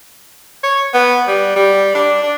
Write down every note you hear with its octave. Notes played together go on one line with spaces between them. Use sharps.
C#5
B3
G3
G3
D4
D4